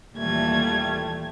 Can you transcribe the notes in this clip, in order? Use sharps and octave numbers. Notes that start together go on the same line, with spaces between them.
D#2 A#2 E3 G3 A3 G#6